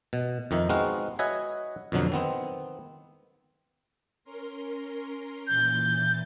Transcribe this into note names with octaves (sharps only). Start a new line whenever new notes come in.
B2
F2 D#3 D#4 E5
G#3 B3 C4 D#4 F#4 F5
F#4 B4 C#5 D#5 E5 G#5
F2 B2 D3 F#3
D#3 B3 C4
C#4 A#4 C6
A#2 E3 G6 A6